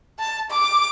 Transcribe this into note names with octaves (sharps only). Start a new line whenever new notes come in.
A5
D6